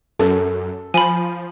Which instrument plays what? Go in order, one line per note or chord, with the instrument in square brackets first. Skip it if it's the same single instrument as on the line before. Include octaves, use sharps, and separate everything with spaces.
[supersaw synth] F#2 [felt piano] A4
[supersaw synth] F3 [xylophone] G#5 B5